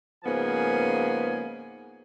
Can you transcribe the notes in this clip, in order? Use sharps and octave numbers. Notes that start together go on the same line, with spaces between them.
G#2 C#3 F3 A#3 B3 G#5